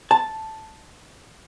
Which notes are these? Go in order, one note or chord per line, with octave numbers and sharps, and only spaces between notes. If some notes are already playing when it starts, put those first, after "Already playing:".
A5